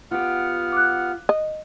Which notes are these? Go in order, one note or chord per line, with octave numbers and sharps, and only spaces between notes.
B3 F4 G4 F#5 F6
D6 F#6
D#5